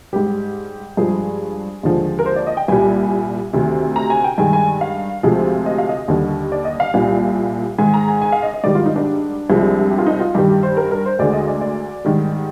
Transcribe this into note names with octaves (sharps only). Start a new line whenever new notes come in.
G#2 G3 G4
G2 F3 G#3 G#4
D#2 D3 F3 G#3
A#4
C5
D5
D#5
G5
C2 A#2 G3 G#5
D2 C3 D#3
A#5
G#5
G5
G2 D#3 G#3 G#5
G#5
F5
D2 C3 F3 G#3
D#5
F5
D#5
D#2 D3 G3
D5
D#5
F5
C2 A#2 G3 F5
G#2 D#3 G#3 G#5
A#5
G#5
G#5
F5
D#5
D#5
G#2 D#3 G3 D5
F4
D#4
D4
C2 C3 F3 G#3
G4
F4
D#4
F4
G2 D#3 G3 G4
G4
C5
A#4
A#4
C5
D2 D3 G#3 D5
D#5
D5
D5
G#2 D#3 G3